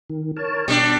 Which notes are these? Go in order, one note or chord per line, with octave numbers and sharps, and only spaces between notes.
D#3
A#4 C#5 A5
B2 G3 D4